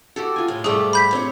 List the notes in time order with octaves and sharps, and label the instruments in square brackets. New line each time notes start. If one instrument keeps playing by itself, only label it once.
[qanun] F#4 G4 A4
F4 G#5
[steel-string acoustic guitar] A2 G#3
[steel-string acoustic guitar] G#2 F3 G3 [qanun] A3 G5 [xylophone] G#4
[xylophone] B5 G6 B6
[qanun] C4 [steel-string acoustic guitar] D4 C#5